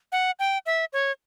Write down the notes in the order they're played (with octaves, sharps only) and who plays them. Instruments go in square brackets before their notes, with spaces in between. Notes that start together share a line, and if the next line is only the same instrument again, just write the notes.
[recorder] F#5
G5
E5
C#5